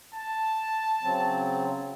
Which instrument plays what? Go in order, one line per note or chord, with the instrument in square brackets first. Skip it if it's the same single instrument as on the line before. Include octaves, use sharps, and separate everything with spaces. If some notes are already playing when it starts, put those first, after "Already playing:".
[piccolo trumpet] A5
[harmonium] C#3 F#3 C4